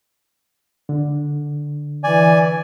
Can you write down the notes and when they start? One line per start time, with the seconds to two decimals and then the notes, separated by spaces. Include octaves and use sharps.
0.89 D3
2.04 E3 D5 G#5